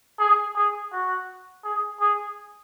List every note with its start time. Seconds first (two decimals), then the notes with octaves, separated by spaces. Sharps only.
0.19 G#4
0.56 G#4
0.92 F#4
1.64 G#4
2.01 G#4